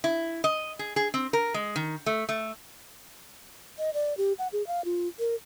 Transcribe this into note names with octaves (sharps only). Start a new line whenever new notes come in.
E4
D#5
G#4
G#4
C4
A#4
G#3
D#3
A3
A3
D#5
D5
G4
F#5
G#4
F5
F4
A#4